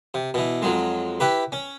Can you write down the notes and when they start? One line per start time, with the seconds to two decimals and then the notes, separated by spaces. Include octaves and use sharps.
0.14 C3
0.34 B2 E3
0.62 F2 F#3 G#3
1.20 E4 G4 B4
1.52 C#4